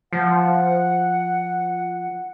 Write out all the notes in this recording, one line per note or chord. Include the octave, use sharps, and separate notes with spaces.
F3 F#5